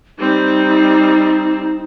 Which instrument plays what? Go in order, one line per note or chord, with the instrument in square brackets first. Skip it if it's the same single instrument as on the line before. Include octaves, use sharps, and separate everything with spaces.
[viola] G3 C4 [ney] D#4